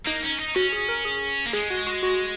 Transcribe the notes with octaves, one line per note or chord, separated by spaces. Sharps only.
A#3 D#4
C#4
D#4
C#4 F#4
G#4
A#4
G#4
A#3
G#3 G#4
F#4
F#4
F#4